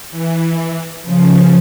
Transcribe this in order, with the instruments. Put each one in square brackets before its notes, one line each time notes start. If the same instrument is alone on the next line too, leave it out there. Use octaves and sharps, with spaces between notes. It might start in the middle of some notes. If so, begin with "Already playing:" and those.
[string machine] E3
[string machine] C#3 [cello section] F3